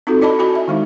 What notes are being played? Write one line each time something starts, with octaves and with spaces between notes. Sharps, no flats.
C4 D#4 F4 F#4 A4
E4 D5 D#5 A5 B5
E4 F#4 G#5 B5
E5
D#3 G#3 D#4